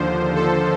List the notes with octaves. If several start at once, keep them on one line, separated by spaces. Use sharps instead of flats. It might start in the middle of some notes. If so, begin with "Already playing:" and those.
Already playing: D#2 D3 F3 C5
A4